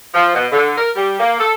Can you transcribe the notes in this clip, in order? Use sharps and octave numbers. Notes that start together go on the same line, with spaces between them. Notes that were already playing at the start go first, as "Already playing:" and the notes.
F3
B2
D3
A#4
G3
A#3
A4